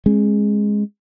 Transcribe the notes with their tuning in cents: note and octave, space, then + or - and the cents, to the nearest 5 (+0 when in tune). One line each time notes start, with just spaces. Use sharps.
G#3 +0 C#4 -40